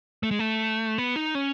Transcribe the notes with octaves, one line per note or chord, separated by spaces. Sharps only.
A3
G#3
A3
B3
D#4
C#4